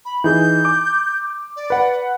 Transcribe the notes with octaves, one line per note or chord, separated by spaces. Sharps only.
B5
E3 D#4 G#4 G6
D6
D5
B4 F#5